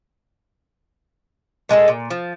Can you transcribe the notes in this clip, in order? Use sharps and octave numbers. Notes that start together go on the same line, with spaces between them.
A#2 G#3 G#4 A4
A#2
F3